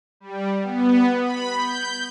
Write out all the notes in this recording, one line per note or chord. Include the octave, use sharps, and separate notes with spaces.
G3
B3
B5
G6